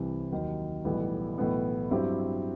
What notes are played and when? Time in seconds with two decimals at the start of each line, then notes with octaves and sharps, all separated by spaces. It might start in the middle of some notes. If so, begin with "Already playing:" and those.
Already playing: C2 C3 E3
0.32 D#2 D#3 F#3
0.85 B1 A2 E3 G3 B3
1.38 B1 A2 E3 B3
1.90 G2 F#3 C4 E4 G4